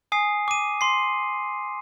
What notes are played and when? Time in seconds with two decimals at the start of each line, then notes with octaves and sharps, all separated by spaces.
0.12 G#5 D#6 C7
0.48 D6 D#7
0.81 C6 C7